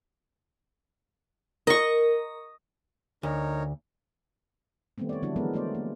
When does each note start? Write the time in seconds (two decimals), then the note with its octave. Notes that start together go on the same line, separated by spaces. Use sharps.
1.67 A#4 D#5 C#6
3.23 D2 D#4 A#4 C#5
4.98 D#3 G3 A3 B3 C4
5.09 C#5 D5
5.22 D3 F3 G3 D4 E4 F#4
5.36 E3 F#3 G#3 B3 A#4
5.54 A3 B3 C5 D5
5.75 A#3